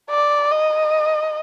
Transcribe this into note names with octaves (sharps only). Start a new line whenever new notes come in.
D5
D#5